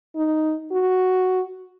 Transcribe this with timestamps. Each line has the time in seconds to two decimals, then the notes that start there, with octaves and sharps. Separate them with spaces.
0.16 D#4
0.72 F#4